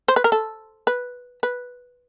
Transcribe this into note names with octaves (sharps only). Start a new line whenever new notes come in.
C5
B4
A#4
A4
B4
B4